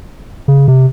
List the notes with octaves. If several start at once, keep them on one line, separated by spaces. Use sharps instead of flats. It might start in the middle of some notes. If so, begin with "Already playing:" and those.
C#3
C3